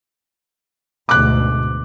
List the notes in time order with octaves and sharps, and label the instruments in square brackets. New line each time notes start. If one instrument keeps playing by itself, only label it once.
[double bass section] D2 G#2 B2 [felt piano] D6 F#6